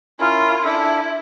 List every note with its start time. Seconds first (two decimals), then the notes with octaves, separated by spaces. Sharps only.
0.19 C#4 E4 F4 A#4
0.64 D4 E4 A4 E5